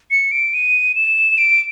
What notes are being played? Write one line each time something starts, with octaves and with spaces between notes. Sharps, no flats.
C#7
D7
D#7
E7
D7